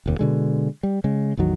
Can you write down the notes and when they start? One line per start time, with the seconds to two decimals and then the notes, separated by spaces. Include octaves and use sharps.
0.06 F1 D#2
0.19 B2 D3 G#3
0.83 G3
1.04 C#3 G#3
1.37 A1 E2 D#3 F#3